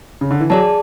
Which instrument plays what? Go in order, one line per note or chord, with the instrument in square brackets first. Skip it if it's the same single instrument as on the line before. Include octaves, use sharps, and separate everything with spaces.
[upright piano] C#3
D3
E3
[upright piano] F#3 [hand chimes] G#4 D5 A5